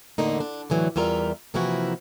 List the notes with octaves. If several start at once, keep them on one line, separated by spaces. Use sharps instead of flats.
E2 A2 D3 A#3 D#4
D4
A2 D3 E3 F#3
E2 G3 F4 A#4 E5
C3 E3 F3 A#3 E4 F#4